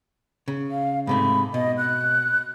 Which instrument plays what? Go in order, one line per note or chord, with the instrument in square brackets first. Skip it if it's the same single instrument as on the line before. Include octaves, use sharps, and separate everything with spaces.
[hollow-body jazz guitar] C#3
[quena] F5
[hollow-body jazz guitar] G#2 C3 A3 [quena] B5
[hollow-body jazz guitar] B2 [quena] D#5
[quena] F#6